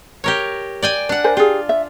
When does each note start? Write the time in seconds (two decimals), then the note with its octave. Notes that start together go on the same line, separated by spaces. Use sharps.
0.24 G4 A#4 C#5
0.82 D5 G5 G#5
1.09 D4 F#5
1.24 A#4 C5 G#5
1.37 F4 G4 G#4
1.69 E5